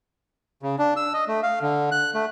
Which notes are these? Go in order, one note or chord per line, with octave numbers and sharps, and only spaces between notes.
C#3
D4
E6
D#5
A3
F5
D3
F#6
A3